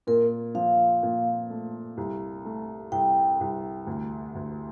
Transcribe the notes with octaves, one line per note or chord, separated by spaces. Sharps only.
A#2 A#4
F3 F5
A#2
A3
C2
A3
C2 G5
C2
D2
D2